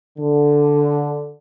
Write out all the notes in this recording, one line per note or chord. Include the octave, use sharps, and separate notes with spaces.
D3